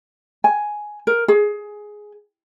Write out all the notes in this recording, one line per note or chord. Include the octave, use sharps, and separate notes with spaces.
G#5
A#4
G#4